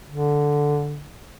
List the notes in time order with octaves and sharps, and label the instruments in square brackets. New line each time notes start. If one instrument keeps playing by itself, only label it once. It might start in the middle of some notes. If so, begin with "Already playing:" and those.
[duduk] D3